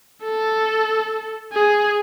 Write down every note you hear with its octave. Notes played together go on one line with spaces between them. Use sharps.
A4
G#4